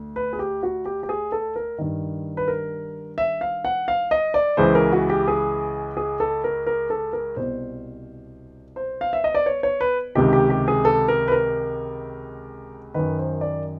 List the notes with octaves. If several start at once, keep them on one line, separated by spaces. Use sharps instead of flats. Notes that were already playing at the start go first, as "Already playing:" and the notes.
Already playing: D2
B4
G#4
G4
F#4
G4
G4
G#4
A4
A#4
G2 D#3
B4
A#4
E5
F5
F#5
F5
D#5
D5
C#2 C#3 E3 C5
A#4
F#4
G4
G#4
G#4
A4
A#4
A#4
A4
A#4
C2 B2 C5
C5
F5
E5
D#5
D5
C#5
C#5
B4
C#2 C3 D#3 G4
G4
G4
G#4
A4
A#4
B4
A#4
F#2 D#3 B4
C5
D5